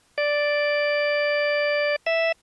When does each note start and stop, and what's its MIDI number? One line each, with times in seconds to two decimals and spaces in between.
0.18 1.96 74
2.06 2.32 76